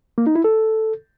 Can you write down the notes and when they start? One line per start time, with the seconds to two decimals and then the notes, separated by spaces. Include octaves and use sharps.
0.18 A#3
0.27 D#4
0.36 E4
0.44 A4